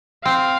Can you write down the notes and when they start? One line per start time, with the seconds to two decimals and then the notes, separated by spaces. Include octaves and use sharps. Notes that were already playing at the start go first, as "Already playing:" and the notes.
0.25 C4 F5